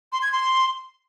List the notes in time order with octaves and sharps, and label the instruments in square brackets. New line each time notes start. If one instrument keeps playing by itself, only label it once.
[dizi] C6
G#6
C6